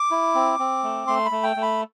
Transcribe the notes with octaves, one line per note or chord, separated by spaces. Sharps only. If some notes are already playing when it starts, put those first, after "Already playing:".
Already playing: D6
E4
C4
C4
A3
A3 C6
B5
A3
G5
A3
B5